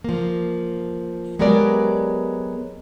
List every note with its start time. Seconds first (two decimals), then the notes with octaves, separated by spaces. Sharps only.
0.04 F3 A#3
1.39 F#3 G#3 B3 G4 A#4 D5